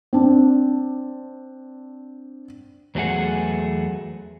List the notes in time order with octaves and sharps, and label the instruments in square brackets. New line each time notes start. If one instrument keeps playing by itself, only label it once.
[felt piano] C4 D4
[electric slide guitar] E2 F#3 A3 G#4 F#5